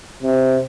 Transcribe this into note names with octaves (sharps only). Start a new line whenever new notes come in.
C3